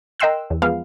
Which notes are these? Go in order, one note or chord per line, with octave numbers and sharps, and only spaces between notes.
A#4 D#5 G5 C6 E6 F#6
E2
F3 G#3 B3 F5